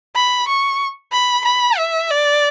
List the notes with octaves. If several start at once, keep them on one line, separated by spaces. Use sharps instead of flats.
B5
C#6
B5
B5
E5
D5